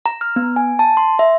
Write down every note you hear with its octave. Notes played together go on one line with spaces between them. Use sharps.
A#5
F6
B3
G#5
A5
C6
E5